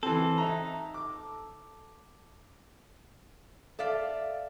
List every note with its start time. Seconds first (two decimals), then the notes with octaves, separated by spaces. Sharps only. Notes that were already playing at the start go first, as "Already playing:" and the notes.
0.03 E3 C4 A4
0.38 D#4 E5 A#5
0.94 D6
3.79 A4 D5 E5 F5